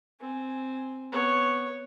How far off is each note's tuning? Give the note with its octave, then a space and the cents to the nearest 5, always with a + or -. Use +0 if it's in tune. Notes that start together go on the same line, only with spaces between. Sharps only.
C4 +0 G#5 +0
B3 +0 C#5 +0